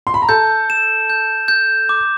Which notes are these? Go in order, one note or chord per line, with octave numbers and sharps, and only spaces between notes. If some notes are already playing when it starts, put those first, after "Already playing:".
C6
B5
A#5
A4 A5 G6
E7
G6
G6
D6